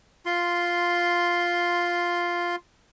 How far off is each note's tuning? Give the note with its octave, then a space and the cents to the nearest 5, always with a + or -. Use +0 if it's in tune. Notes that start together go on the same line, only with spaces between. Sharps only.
F4 +0 C6 +0